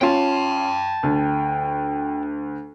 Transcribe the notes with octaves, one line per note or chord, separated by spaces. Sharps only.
C#4 F4 G5 A5
D2